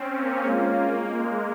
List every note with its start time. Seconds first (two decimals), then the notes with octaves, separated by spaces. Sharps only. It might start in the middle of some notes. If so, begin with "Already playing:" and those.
Already playing: C4 C#4
0.14 A#3
0.45 G#3 A#3 C#4 F4
1.05 G#3